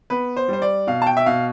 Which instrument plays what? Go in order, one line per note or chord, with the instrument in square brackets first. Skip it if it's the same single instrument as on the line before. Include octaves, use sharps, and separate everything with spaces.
[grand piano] B3 B4
C5
G3 C5
D5
B2 F5
A5
G5
E5
B2 F5